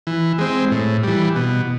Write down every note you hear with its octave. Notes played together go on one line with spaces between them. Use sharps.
E3
G#3 C4
A2
E3 G3
B2